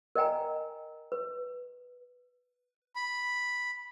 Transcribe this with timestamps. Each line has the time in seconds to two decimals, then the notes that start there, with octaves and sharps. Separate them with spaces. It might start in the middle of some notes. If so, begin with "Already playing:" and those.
0.15 A#4 D5 D#5 G5 G#5 A#5
1.12 B4
2.96 B5